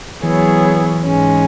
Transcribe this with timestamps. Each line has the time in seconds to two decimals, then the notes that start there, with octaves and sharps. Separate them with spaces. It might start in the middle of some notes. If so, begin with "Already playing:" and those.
0.23 E3 F#3 B3 E4 G#4 C#5
1.03 G#2 G#3 C#4